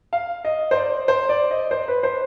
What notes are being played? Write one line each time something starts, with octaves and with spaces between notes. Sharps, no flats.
F5
D#5
C5
D5
C5
D5
D#5
C5
B4
C5